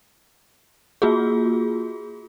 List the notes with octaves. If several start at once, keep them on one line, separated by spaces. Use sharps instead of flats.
A#3 F4 F#4 G#4